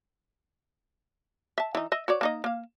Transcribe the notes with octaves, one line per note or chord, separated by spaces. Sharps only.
E5 A5
E3 D#4
D#5 E5
F#4 C#5 D5
A#3 D#4 D#5
A#3 F5